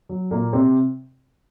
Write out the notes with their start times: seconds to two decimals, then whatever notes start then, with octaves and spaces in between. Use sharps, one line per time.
0.09 F#3
0.31 A#2 A#3
0.53 C3 C4